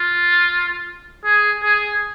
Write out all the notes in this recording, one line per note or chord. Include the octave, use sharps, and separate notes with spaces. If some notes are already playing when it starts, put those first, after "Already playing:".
Already playing: F4
G#4
G#4